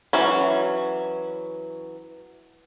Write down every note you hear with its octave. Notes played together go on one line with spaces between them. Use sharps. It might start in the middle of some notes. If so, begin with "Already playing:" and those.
E3 F#3 C#4